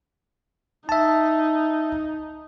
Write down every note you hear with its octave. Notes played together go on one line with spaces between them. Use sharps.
D#4 E5 A5